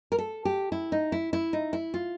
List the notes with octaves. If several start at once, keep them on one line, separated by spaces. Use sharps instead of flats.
A#4
A4
G4
E4
D#4
E4
E4
D#4
E4
F4